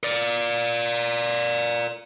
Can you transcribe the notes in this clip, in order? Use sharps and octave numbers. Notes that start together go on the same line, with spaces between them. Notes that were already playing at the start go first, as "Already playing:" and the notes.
A#4 D5